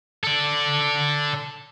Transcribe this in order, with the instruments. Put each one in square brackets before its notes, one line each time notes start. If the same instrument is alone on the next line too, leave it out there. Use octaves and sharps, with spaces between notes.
[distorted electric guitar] A4 D5